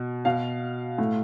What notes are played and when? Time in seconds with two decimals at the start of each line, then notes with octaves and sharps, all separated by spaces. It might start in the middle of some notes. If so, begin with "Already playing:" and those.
Already playing: B2
0.25 B2 F5
0.98 A2